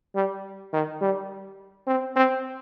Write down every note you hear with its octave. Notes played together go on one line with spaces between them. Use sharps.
G3
D#3
G3
C4
C4